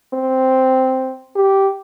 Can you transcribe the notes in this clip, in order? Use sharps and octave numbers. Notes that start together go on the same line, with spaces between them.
C4
G4